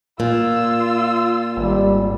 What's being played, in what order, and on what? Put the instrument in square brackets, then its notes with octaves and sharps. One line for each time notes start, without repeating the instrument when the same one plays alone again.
[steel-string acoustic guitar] A#2 [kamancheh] F4 E6
[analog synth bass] G#1 [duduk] G3